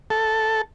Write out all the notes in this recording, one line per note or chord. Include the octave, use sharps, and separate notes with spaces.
A4